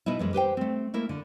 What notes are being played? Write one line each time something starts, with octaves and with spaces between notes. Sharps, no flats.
B2 B3 D#4 E4
F#2 E3 G#3
G4 B4 C5 G5
A3 C4
A3 A#3 E4 A#4
D3